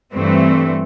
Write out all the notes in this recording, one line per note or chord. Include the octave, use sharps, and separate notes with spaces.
G2 E3 A3 C4